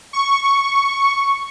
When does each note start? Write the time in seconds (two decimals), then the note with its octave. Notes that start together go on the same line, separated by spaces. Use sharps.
0.13 C#6